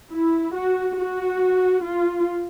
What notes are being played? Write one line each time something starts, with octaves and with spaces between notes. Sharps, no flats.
E4
F#4
F#4
F4